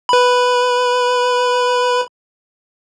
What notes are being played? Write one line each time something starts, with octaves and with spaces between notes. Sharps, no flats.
B4 B5